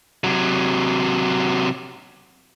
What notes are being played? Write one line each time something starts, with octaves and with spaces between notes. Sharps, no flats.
C3 F#3